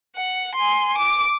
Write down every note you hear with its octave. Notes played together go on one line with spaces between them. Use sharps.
F#5
G#5 C6
D6